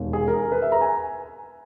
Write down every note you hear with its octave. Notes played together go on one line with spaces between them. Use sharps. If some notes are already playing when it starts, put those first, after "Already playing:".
Already playing: E1 D#2 D#3
G#4
A#4
A#4
B4
E5
A#5
G#5